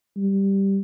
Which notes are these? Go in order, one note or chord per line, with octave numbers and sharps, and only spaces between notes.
G3